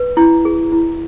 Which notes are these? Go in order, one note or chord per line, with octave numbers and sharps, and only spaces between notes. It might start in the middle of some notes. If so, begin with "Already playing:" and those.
Already playing: B4
E4
G#4
E4